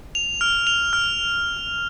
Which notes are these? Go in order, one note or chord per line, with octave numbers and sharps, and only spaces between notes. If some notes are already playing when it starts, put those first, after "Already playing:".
F7
F6
F7
F6